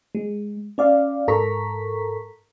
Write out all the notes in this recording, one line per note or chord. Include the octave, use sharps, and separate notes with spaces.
G#3
C#4 D5 F5
G#2 A4 A#4 A#5 C#6 B6